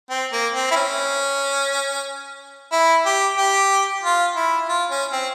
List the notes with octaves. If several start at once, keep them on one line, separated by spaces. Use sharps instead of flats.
C4
A#3
C4
E4
C#4
E4
G4
G4
F4
E4
F4
C#4
C4